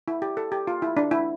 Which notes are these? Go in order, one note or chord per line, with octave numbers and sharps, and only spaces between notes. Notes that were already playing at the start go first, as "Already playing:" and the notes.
E4
G4
A4
G4
F4
E4
D4
E4